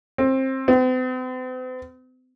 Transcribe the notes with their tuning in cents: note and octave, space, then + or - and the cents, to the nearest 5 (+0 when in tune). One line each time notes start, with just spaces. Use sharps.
C4 +20
C4 -45